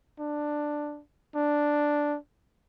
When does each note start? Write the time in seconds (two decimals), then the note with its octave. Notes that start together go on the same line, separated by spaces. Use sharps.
0.20 D4
1.36 D4